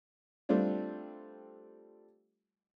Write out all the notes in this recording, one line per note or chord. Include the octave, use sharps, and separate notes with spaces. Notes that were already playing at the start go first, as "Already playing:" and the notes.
G3 A3 C4 D4 F4